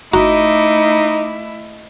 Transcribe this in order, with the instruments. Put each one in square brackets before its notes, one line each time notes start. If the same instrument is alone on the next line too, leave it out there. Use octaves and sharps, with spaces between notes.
[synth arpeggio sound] G1 F#4 A#5 [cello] A3 E4 [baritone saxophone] D#4 [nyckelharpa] D#5 D6